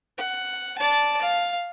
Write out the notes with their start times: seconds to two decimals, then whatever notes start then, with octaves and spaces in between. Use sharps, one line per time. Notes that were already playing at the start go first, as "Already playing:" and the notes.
0.18 F#5
0.78 D5 A5
1.22 F5